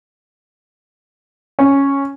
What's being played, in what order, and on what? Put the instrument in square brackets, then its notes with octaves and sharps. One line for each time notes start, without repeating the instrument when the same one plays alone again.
[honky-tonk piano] C#4